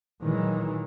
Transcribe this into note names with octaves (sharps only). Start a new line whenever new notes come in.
A#2 D#3 E3 F#3 G#3